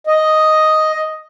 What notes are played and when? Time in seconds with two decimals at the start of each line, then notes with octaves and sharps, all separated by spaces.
0.07 D#5